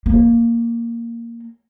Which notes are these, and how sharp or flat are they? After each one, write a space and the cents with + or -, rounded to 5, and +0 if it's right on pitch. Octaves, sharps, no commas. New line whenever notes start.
A#3 -5